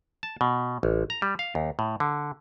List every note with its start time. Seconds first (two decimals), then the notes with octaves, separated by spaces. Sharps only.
0.23 A5
0.41 B2
0.83 A1
1.10 A#5
1.22 G3
1.39 F5
1.55 D#2
1.79 A2
2.00 D3